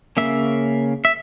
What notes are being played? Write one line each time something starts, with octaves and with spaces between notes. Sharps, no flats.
C#3 F3 A#3 C#4 E5
E5